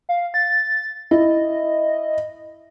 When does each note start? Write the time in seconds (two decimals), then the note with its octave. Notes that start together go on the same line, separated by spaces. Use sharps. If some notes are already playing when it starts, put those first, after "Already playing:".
0.09 F5
0.34 A6
1.11 E4 D#5